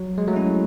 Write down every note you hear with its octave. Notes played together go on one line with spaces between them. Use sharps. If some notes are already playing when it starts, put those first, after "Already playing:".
Already playing: F#3
G#3
F#3 A3
C#4 E4